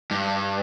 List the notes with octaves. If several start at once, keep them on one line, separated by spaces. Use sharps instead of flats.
G2